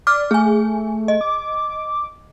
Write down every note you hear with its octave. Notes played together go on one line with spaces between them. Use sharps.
D5 D6 F6
A3 G#4 G#5
D#5
D6